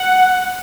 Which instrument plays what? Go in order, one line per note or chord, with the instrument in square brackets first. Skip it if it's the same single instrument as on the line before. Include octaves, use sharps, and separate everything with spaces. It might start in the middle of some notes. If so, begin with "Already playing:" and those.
Already playing: [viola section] F#5